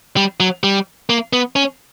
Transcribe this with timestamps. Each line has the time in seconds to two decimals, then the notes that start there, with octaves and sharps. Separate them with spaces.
0.17 G3
0.40 F#3
0.64 G3
1.10 A#3
1.33 B3
1.56 C#4